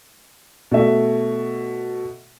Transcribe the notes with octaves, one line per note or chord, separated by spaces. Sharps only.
B2 A3 E5